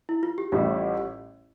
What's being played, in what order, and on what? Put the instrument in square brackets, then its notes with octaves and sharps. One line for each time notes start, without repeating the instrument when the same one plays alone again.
[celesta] E4
F4
G4
[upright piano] A1 A2 G3 [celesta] F4